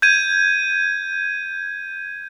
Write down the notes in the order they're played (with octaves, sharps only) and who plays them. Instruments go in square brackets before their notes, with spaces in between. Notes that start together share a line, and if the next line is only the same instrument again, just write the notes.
[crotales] G6 G#6 D#7